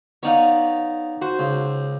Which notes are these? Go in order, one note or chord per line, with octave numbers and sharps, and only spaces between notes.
B3 D#4 C#5 D5 F5
F#4 C5
C#2